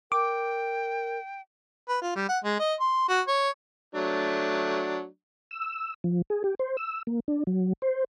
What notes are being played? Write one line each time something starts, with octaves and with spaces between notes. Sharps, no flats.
A#4 G5 D6
B4
F4
G3
F#5
G#3
D#5
C6
F#4
C#5
F#3 A3 D4
E6
F3
G#4
G4
C5
E6
A#3
D4
F#3
C5